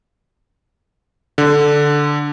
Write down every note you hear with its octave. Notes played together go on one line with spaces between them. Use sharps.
D3